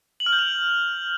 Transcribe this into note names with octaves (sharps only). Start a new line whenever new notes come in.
F#7
F6
G6
F7